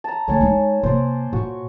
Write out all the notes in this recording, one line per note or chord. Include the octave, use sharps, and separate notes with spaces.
A5 A#5
D3 A3 C#5 G#5 A5
G#3 D#4
C3 A#3 C5 D5
A#2 F#4 C#6